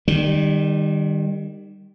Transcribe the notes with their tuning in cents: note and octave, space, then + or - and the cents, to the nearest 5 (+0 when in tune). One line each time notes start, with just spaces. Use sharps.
D#3 -25 G3 +10